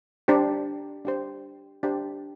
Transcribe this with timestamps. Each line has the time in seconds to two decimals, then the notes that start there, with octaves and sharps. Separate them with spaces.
0.28 D4 G4 C5
1.05 D4 G4 C5
1.83 D4 G4 C5